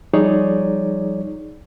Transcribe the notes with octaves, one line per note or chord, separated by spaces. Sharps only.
F3 G3 D#4 G#4 C#5 D5